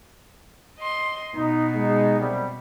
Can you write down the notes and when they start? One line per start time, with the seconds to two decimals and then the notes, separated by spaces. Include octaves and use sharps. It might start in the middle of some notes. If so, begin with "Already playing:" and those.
0.78 D#5 C6
1.35 B2 D#4
1.74 G#3 D#4
2.19 F#2 C3 G3